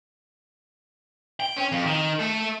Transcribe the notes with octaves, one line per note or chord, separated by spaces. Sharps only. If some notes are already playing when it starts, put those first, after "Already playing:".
G5
C#4
F2
D#3
A3 A4